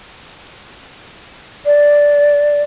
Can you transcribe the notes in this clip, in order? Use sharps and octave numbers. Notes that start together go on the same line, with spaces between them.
D5